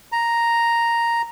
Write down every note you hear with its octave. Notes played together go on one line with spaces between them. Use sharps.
A#5